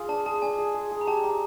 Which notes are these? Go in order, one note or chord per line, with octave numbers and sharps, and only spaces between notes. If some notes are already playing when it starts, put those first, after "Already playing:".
Already playing: F4 G#4
D4 A5
G#4 A5
D4 G#5
G#4
G#4
G#4
A#5
G4 A5
G4 A#5